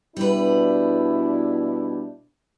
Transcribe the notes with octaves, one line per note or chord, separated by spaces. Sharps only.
B2 G3 D4 E4 B4